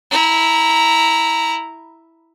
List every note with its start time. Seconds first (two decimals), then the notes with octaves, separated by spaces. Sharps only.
0.10 E4 A#5